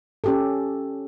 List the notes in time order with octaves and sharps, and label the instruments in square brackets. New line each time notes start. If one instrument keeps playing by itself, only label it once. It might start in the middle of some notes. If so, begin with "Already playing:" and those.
[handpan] C#4 G4 A4